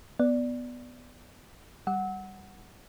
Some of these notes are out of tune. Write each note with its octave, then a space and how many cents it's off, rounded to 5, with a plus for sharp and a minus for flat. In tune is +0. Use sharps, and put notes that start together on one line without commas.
B3 +0 D5 +0
G3 +0 F#5 +0 E6 -30